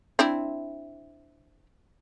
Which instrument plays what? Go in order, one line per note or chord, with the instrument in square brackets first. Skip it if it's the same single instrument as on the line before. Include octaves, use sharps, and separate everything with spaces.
[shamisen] C4 D4 E4